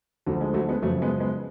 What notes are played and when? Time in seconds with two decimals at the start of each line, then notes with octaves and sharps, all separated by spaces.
0.26 D2 D3 F3 F#3
0.41 G#3
0.54 F#3 A3
0.68 G#3 B3
0.82 F#2 C#3 F3 F#3 A3
1.02 G#3 B3
1.20 G#3 B3